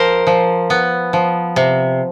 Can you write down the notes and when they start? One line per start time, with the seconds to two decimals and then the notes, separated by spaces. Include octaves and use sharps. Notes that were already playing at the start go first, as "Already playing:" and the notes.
Already playing: F3 A#4 C5
0.27 F3
0.70 B3
1.13 F3
1.56 C3